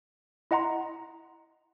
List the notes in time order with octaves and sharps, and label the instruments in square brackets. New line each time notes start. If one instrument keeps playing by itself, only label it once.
[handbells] E4 D#5 F#5 A#5 C6